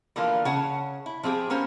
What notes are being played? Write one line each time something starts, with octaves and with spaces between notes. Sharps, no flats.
D3 E3 F3 A#3 F4
C#3 C#5 F#5 A5
E4
F3 C4 G4 G#4
A#3 B3 C#4 C5 G#5